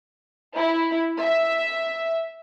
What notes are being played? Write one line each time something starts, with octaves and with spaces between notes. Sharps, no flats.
E4
E5